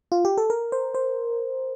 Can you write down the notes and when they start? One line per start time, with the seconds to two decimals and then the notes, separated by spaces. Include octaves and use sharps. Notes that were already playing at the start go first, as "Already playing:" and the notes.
0.12 F4
0.25 G4
0.38 A4
0.50 A#4
0.72 C5
0.94 C5